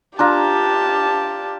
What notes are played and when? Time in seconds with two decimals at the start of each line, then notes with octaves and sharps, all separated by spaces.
0.19 D4 F4 G4 A5 A#5